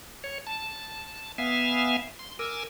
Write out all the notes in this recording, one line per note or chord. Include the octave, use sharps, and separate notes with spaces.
C#5
A5
B3 E5 F5 G#5
C6
A#4 G#5 D6 E6